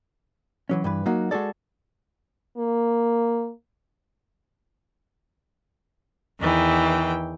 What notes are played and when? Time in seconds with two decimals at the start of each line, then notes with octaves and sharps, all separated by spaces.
0.69 E3 F#3 C#4
0.84 G2 E3 B4
1.06 F#3 A#3 D#4 F#4
1.31 G#3 F#4 G#4 A4 D5
2.57 A#3
6.41 E2 D#3 E3 G5